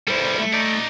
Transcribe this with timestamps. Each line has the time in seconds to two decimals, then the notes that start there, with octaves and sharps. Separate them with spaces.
0.08 G3 E4 A4 B4 C5
0.39 A3
0.53 D#4 D5